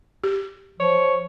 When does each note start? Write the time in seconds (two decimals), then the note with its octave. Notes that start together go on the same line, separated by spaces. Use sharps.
0.24 G4
0.80 F3 C#5